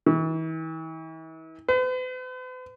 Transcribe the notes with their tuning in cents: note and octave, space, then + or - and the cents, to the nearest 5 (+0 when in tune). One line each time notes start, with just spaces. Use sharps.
E3 -40
B4 +45